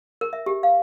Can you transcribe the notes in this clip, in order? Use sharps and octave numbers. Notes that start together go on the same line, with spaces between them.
A#4
E5
G4
F5